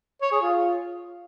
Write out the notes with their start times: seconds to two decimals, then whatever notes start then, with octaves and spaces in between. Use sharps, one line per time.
0.22 C#5
0.32 G#4
0.42 F4